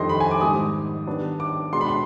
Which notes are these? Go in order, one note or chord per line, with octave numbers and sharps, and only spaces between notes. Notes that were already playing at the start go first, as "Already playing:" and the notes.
Already playing: F2 D#3 G3 D4 D#5 C6
B5
G#5
D6
G#2 D#3 G3 D#6
D#3 G3 B3 D4
D6
B2 G#3 D4 C6
B5
C6